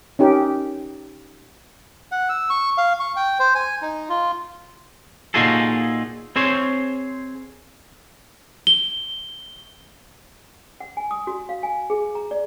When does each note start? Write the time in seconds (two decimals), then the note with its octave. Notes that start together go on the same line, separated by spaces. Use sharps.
0.19 C#4 D#4 G4 A#4
2.12 F#5
2.29 E6
2.50 C#6
2.78 F5
3.00 C#6
3.16 G5
3.39 C5
3.55 G#5
3.82 D#4
4.09 F4
5.34 A#2 D#4 F4 F#4 G#4 A4
6.36 C4 G#4 C5 C#5
8.67 G7
10.80 F#5
10.97 G#5
11.11 D#6
11.27 F#4
11.49 F5
11.63 G#5
11.90 G#4
12.15 A#5
12.31 D5